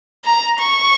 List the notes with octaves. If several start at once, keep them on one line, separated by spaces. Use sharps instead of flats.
A#5
C#6